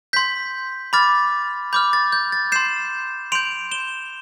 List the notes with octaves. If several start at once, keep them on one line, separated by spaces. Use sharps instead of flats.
C6 G6 B6
B5 D6 F6 A6
B5 D6 F6 G6
A6
G6
A6
C6 G6 C7 E7
C6 G6 D7 F7
E7 G7